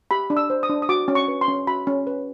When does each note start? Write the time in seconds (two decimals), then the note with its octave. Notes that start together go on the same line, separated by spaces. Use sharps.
0.11 G4 B5
0.30 D4
0.37 E6
0.50 C5
0.63 D#6
0.70 D4
0.82 D#6
0.89 F#4 D6
1.08 C#4
1.15 C#6
1.28 B4
1.41 C6
1.48 C#4
1.67 F#4 B5
1.87 C#4
2.07 B4